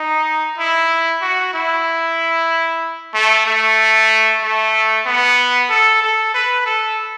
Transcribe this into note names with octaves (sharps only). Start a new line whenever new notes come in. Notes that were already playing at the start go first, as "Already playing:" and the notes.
Already playing: D#4
E4
F#4
E4
A3
A3
A3
B3
A4
A4
B4
A4